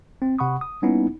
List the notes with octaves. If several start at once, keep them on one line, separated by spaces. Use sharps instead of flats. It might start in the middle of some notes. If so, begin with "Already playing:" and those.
C4
C3 F#5 B5 C#6 D#6
D#6
G3 A#3 B3 C#4 D#4 E4